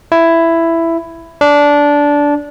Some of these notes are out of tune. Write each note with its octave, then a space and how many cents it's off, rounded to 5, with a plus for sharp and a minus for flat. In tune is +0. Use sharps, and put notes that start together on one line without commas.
E4 +10
D4 -15